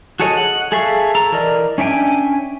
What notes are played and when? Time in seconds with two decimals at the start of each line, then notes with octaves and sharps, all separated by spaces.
0.20 F#4 G#4 A4 C#5 D#5
0.37 F#5
0.72 G#4 A4 E5 F5 C#6
1.15 A4 A#5
1.32 E3 A#4 D5 D#5
1.78 C#4 D4 E5 G5 G#5